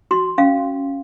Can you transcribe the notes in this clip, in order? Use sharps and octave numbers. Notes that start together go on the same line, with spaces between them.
F#4 C6
C#4 F5